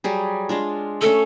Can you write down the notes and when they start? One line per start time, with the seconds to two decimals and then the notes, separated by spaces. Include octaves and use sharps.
0.04 F#3 G3 G#4
0.49 G#3 D4 F4
1.01 A3 C#4 A4